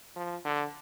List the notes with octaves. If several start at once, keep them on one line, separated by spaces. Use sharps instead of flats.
F3
D3